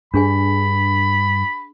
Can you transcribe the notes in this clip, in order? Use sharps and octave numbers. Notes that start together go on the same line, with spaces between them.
G2 D4 G#4 G#5 B5